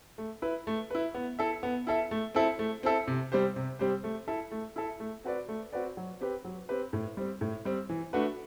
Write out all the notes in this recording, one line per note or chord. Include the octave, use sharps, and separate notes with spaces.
A3
E4 B4
A3
E4 B4
B3
E4 A4 E5
B3
E4 A4 E5
A3
C4 E4 A4 E5
A3
C4 E4 A4 E5
C3
G3 C4 G4 C5
C3
G3 C4 G4 C5
A3
E4 A4 E5
A3
E4 A4 E5
A3
C4 F#4 B4 D5
A3
C4 F#4 B4 D5
F#3
C4 G4 B4
F#3
C4 G4 B4
A2
G3 C4
A2
G3 C4
E3
A3 D4 F#4 B4